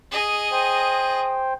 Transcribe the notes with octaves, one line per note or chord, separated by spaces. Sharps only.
G#4 D#5
C5 G5